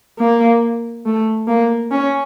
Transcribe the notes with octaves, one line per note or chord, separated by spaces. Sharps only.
A#3
A3
A#3
C#4